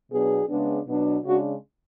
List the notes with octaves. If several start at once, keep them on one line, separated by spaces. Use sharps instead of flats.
B2 F#3 B3 D4 G#4
C#3 G#3 B3 D4
B2 F#3 B3 D4
C#3 G#3 D4 F#4